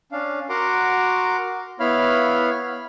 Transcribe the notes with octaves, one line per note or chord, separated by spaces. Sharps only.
C#4 D4 F5
F#4 A#4 F#5 A#5 C6 D6
B3 E4 C#5 F5 B5 F6